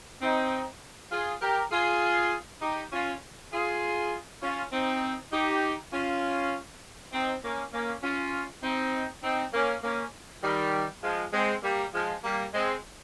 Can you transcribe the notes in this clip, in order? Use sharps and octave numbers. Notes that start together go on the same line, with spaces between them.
C4 D#4
F4 G#4
G4 A#4
F4 G#4
D#4 G4
C#4 F4
F4 G#4
C#4 F4
C4 D#4
D#4 G4
C#4 F4
C4 D#4
A#3 C#4
A#3 C#4
C#4 F4
C4 D#4
C4 D#4
A#3 C#4
A#3 C#4
D#3 G3
F3 G#3
G#3 C4
G3 A#3
F3 G#3
G3 A#3
G#3 C4